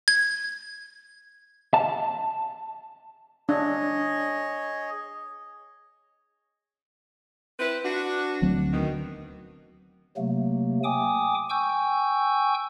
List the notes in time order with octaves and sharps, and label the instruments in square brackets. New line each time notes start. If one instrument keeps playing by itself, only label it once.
[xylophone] G#6
[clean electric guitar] A5
[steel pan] D4 [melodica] G#4 C#5 D#5
[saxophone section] C4 E4 B4
D4 F#4
[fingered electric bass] D2 F#3 C4
[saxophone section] B2 D#3
[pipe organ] C3 F#3 A3 A#3
G5 G#5 D6 D#6
G5 G#5 C#6 E6 G6